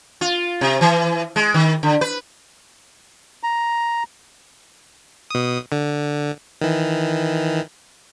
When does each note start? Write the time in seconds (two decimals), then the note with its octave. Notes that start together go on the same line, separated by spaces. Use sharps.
0.21 F4
0.61 C3
0.81 E3
1.36 G#3
1.54 D#3
1.83 D3
2.01 B4
3.43 A#5
5.31 B2 D#6
5.72 D3
6.61 D#3 E3